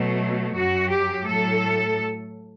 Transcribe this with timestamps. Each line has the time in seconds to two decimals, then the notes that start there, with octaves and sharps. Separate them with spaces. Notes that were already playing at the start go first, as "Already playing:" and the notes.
Already playing: B2 F#3 A3
0.54 F#2 F#3 F#4
0.90 G4
1.26 A2 F#3 A4